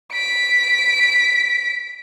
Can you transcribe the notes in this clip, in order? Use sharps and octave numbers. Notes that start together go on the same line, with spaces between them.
B6 D7